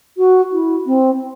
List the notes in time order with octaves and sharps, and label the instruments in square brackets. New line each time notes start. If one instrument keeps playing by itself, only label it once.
[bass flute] F#4
E4
C4